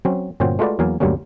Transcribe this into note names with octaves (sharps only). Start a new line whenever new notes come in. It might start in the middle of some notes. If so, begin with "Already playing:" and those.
F#3 C4 C#4
G1 A#2 C#4 F#4 C5 G5
G#3 A3 F4 F#4 B4 D5
E2 F#3 A#3 F5 G#5
D2 G2 F#3 G3 A#3 C#4